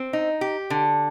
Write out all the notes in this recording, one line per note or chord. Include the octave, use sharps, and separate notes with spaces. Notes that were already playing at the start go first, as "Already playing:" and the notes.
Already playing: C4
D#4
G4
D3